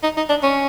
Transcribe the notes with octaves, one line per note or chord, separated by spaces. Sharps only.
D#4
D#4
D4
C#4